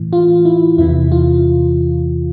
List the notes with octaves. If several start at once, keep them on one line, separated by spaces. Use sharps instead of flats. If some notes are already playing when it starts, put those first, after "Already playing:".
Already playing: A2 E3
F4
E4
E2 C3 E3 E4
F4